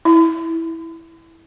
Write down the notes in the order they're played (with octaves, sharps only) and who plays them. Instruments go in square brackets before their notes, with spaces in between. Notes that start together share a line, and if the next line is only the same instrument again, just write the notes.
[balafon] E4